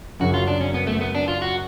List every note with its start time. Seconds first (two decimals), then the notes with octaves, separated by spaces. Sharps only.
0.20 F#2 C#3 F#3 F#4
0.34 F4
0.48 D4
0.61 C#4
0.74 B3
0.87 A3
1.01 B3
1.15 D4
1.28 F4
1.42 F#4